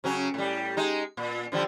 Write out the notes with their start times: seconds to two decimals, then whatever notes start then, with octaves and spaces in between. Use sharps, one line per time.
0.04 C#3 F#3 C#4
0.34 A2 G3
0.77 G#3 D#4
1.17 A#2
1.52 D3 F3 G3